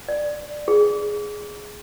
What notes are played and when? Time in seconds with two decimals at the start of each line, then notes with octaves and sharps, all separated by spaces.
0.08 D5
0.68 G#4